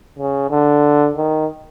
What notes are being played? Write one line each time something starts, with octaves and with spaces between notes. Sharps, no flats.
C#3
D3
D#3